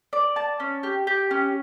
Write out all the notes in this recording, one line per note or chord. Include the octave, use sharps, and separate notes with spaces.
D5
A5
C#4
G4
G4
C#4